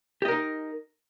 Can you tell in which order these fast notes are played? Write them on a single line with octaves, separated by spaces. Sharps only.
G4 D#5 A#4 D#4